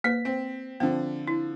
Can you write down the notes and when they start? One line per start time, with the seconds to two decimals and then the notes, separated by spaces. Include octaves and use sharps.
0.04 A#3 B4 B6
0.25 C4
0.80 D3 F3 C4
1.28 E4